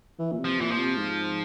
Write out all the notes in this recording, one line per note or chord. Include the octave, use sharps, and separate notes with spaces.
E3
A#2
C3
F3
A#2 E3
F3
C3
G#2